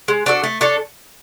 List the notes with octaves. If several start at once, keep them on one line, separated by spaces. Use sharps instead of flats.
G#3
D4 F#4 A4
A3
D4 A4 C#5